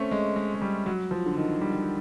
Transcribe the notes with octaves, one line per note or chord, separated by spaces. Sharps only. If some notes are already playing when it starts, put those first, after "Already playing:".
Already playing: A3 C4 C#4
G#3
G#3
G#3
G3
F#3
F3
D3
D#3
G3